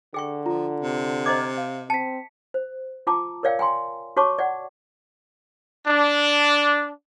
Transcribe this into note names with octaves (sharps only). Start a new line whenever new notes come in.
D3 G#4 G5 C#6
F3 F4 A#5
C3
C5 D#5 A#5 D6 G#6
F5
C4 A5 B6 C#7
C5
F4 G5 A5 A#5 D6
A#4 C#5 D5 F5 G5
G5 G#5 A#5 C6
F#4 C#5 A5 C#6 D6
D5 F#5
D4